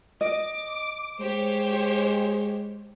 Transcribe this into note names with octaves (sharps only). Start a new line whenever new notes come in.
D#5 D6
G#3 G4 C5 C#5